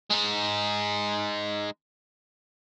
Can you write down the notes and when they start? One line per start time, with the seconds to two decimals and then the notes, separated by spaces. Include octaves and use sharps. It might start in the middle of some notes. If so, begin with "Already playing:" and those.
0.10 G#3 D#4